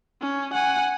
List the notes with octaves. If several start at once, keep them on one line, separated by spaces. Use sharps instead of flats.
C#4
F#5 G#5